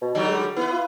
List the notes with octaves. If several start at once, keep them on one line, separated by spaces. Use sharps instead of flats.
B2
D3 F#3 G3 D#4
G#3
B3 E4 B4
F4